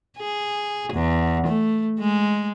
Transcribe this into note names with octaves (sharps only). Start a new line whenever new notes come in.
G#4
E2
A3
G#3